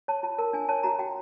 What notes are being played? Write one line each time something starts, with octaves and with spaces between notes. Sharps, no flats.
C#5 A5
F4 A5
A#4 A5
D4 G#5
C#5 A5
F#4 A#5
F#4 G5